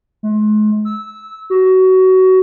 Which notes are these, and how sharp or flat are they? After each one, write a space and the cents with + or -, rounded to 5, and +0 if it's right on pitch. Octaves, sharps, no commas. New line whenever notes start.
G#3 +40
E6 -15
F#4 +20